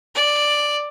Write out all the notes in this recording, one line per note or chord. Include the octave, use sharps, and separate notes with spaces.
D5